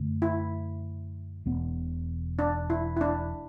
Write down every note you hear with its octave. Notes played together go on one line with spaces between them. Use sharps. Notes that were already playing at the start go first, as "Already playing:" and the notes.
Already playing: F#2 D3 A3
E4
E1 E2 B2 B3
D4
E4
E4
D4